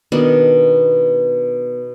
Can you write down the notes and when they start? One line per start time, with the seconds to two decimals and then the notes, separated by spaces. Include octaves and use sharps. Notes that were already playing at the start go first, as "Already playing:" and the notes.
0.12 B2 D#3 B3 D4